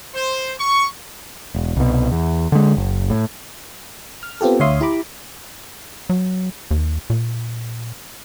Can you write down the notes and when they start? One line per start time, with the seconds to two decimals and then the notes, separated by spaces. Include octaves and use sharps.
0.15 C5
0.59 C#6
1.54 E1
1.77 C2 B2
2.12 E2
2.52 D3 G#3
2.77 F#1
3.10 A2
4.23 F6
4.41 B3 C4 F4 G4 A4
4.60 D2 C#5 E5 F5 C6 D#6
4.81 E4 G4 A#5 B5 D6
6.10 F#3
6.71 D#2
7.10 A#2